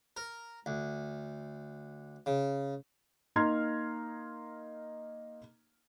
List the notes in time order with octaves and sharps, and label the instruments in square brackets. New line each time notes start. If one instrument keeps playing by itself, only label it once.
[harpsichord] A#4
D2
C#3
[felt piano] A#3 D#4 A#5 C6 F6 G#6